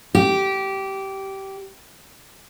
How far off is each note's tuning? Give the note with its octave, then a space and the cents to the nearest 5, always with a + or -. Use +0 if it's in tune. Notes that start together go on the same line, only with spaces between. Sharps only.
G4 -15